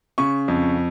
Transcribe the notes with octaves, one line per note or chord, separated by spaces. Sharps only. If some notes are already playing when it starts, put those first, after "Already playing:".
C#3 C#6
F2